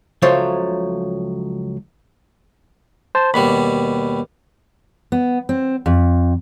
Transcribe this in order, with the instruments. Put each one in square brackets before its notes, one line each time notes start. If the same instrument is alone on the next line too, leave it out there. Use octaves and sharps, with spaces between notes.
[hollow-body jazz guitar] C#2 F3 F#3 A3 C5 C#5
[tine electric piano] C5 A5
[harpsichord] D#2 B2 G3 [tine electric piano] B5
[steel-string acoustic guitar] B3
C4
F2